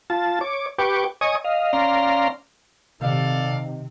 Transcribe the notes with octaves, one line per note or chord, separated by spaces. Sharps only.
F4 A5
C#5 D6
G4 B4 G5 C#6 D6
C#5 D#5 G#5 C#6 D#6
D#5 F5
C#4 D5 F5 A#5 C6
C3 D#3 D#4 A4 D5 F5